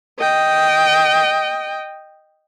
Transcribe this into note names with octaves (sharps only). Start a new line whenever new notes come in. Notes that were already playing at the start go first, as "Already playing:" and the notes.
D#5 G5